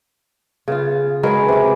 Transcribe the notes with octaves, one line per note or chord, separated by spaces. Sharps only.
C#3 B3 F4
F#3 G#3 A#4 B4 F5 G#5
C3 B4 D6